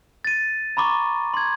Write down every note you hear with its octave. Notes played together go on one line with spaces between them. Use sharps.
A6 D#7
A#5 B5 C#6 D6
C6 G#6